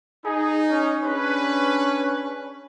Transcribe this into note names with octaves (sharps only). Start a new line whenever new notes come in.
D#4 G#4
C#4
C#4 D4 G#4 B4